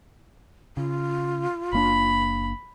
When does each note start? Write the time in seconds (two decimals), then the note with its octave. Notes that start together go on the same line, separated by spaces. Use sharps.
0.77 C#3 F4
1.73 F#1 A#3 D4 B5